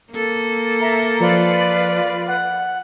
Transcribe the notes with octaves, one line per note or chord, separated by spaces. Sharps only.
A#3 A4
E5 A#5
F3 F4 B4 D5
F#5